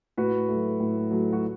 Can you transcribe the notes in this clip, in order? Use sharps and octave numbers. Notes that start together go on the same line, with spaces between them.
A2 F#4 B4
A3
F#3
A2
F#3 A3
F#4